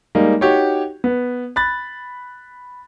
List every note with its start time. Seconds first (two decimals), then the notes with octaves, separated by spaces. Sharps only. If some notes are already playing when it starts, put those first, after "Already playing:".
0.15 G3 G#3 A#3 D#4
0.41 D#4 F#4 G4 C#5
1.04 B3
1.56 B5 F#6 A6